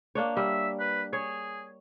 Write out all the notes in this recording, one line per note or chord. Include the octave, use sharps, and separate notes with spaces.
A#3 D4 C#5
G3 E5
B4
G#4 C#5